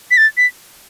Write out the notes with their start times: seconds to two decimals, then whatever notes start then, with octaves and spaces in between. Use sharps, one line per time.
0.11 B6
0.17 A6
0.37 B6